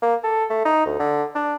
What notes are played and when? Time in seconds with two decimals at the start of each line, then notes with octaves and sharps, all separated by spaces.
0.03 A#3
0.24 A4
0.50 A3
0.65 D#4
0.86 D2
1.00 D3
1.35 D4